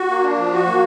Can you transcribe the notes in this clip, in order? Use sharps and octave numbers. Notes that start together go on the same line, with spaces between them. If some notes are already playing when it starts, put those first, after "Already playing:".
Already playing: F#4
A#3
D4
F3
F#4
A#3